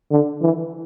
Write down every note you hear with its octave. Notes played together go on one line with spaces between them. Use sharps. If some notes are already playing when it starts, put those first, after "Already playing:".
D3
E3